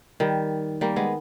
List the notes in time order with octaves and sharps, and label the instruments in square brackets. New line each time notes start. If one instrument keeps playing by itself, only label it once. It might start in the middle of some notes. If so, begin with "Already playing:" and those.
[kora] D#3 G3
G3 A#3
G#3 B3